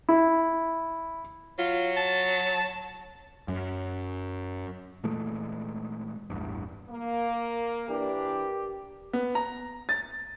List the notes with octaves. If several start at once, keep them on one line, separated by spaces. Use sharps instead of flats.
E4
F#3 F4
A5
F#2
A#2 E3 G#3 A3
A1 E2 G2
A#3
E3 D4 G4 A#4
B3
A#5
A6